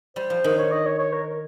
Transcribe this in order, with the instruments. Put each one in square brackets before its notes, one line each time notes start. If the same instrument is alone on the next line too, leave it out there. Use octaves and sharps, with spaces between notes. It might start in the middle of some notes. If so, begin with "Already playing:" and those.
[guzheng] G3 [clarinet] C5
[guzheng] F3
D#3
[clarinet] C#5
D#5
C#5
C#5
A#4
A#4